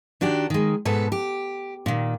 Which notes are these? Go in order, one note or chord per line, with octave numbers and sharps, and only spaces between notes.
D#3 D4 F#4 G4
D#3 G#3
G#2 B2 A4 B4
G4
A#2 D#3